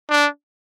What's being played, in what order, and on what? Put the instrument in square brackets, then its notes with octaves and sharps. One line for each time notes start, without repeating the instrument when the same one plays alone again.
[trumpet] D4